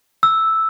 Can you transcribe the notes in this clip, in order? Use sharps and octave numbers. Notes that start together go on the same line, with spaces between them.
E6